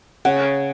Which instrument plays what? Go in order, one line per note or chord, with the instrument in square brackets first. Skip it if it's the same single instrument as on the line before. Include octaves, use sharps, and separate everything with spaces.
[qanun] C#3 [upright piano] F#5